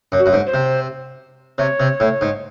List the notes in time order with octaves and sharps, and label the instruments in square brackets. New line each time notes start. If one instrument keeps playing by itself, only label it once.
[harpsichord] F#2
[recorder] F#4
[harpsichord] F#2
G#2
[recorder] C5
[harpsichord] C3
[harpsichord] C3 [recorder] C#5
[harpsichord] C3
A2
G#2